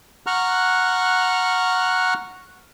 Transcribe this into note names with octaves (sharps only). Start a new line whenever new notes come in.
F#5 A#5 C#6 F6 F#6